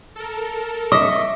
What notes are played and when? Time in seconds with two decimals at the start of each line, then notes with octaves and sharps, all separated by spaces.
0.16 A4 A#4
0.92 D#5 E5 C#6 D6